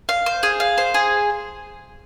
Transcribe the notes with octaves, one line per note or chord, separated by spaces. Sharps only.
F5
C5
G#4
F5
C5
G#4